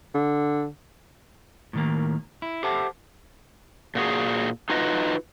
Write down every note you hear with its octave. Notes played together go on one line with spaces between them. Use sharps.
D3
A2 D#3 A#3
E4
G4 A4 C5 E5 F#5 A5
A#2 F#4 G#4
D#4 F4 F#4 B4 D#5